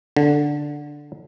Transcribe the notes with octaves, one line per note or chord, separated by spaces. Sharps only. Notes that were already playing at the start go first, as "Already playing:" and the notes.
D3